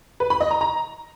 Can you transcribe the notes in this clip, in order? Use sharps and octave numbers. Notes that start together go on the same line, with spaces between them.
B4
B5
D#5
A#5
A#5